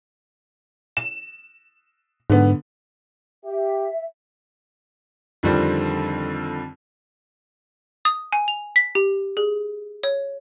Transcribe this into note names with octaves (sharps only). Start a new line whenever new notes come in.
E7
G#2 D3 B3
G4 E5
F2 D3 D#3 G3 C4
D#6
G#5
F7
B6
G4
G#4
C#5